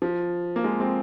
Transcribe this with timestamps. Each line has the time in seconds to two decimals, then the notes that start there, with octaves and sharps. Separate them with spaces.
0.02 F3
0.56 A#3
0.64 F3 G#3
0.80 G#3 C4